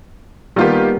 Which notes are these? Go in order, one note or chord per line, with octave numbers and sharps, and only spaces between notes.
D#3 G3 A#3 B3 F4 G4